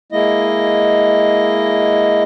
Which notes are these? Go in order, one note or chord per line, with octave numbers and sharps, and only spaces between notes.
G#3 A#3 E4 D#5